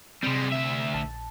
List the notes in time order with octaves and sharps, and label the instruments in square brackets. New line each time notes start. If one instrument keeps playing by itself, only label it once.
[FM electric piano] C3 C4 [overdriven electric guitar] G3 G#3
[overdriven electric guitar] D2 E5
[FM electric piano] A#1 A5